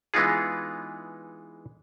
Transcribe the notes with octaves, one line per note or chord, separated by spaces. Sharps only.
E3 G#3 B3 D#4 F4 G#4